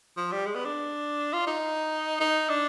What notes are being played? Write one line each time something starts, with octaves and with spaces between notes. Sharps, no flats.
F3
G3
G#3
B3
D4
F4
D#4
D#4
D4